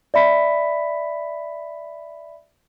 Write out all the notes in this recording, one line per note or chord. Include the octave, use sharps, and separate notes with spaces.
D5 E5 B5 B6